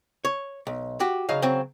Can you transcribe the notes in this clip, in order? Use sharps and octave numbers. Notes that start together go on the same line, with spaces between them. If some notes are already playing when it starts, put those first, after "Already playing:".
C#5
B1
F#4 G4
C#3 F#3 D#4 F5
C#3 F#3 C4